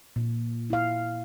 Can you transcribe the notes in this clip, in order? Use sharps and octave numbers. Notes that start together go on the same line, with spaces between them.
A#2
E4 F5